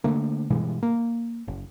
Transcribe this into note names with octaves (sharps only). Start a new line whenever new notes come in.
D3 A3 A#3
G2 B2 E3 G#3
A#3
F#1